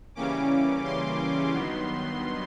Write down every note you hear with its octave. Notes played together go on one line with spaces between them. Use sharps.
C#3 E3 G3 A#3 C#4 D6
C6
G2 D#3 F#3 B3